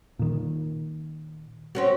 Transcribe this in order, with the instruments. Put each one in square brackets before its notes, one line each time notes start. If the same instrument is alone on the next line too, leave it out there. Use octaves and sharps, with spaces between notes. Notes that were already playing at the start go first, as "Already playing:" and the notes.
[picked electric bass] A#2 D#3
[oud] C4 C#4 F#4